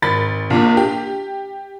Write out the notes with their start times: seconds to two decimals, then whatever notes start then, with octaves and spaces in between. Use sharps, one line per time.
0.02 G#1 B5 A6
0.50 A#1 A#2
0.77 G4